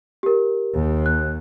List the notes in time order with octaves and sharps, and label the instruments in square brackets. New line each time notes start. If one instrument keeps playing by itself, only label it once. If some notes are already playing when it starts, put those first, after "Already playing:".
[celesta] G4 A#4
[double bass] D#2
[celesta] F#6